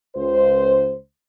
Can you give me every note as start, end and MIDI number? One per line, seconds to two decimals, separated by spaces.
0.15 0.94 37
0.15 0.94 72